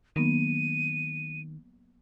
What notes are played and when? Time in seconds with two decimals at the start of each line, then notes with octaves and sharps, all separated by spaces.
0.16 D#3 F#3 A#3 B3 D#7